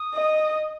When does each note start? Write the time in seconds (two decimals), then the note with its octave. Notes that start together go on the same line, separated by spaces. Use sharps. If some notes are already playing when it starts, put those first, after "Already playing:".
Already playing: D#6
0.14 D#5